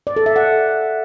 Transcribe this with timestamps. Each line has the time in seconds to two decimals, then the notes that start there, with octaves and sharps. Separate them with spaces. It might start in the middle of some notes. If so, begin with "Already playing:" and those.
0.07 D5
0.16 A4
0.26 E5
0.36 F#5